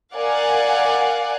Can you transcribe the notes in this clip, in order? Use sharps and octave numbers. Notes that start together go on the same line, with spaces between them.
A#4 D5 F5 F#5 G#5